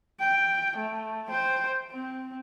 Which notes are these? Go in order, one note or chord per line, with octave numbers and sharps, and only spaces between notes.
G5
A3
C5 G5
C4